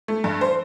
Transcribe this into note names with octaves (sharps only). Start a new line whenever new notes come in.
A3
G2
C5